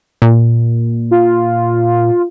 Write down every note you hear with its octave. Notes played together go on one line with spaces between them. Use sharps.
A#2
F4